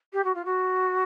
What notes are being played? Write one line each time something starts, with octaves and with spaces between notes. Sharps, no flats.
G4
F#4
F4
F#4